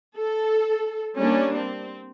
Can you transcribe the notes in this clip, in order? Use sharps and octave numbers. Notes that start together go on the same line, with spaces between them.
A4
G3 A#3 C#4 D4
C4